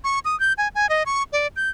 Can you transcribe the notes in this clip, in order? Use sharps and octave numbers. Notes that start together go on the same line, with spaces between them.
C#6
D#6
G6
G#5
G#5
D#5
C#6
D5
G6